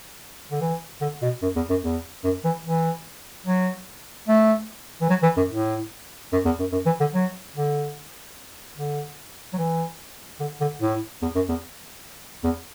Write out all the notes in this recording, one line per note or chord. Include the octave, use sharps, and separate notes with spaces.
D3
E3
D3
B2
F#2
E2
F#2
E2
F#2
E3
E3
F#3
A3
E3
F#3
E3
F#2
A2
F#2
E2
F#2
F#2
E3
D3
F#3
D3
D3
F#3
E3
D3
D3
A2
E2
F#2
E2
E2